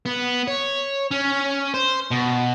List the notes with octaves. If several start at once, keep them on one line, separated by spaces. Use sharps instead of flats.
B3
C#5
C#4
C5
B2